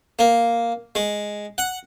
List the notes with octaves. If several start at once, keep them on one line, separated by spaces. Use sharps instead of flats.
A#3
G#3
F#5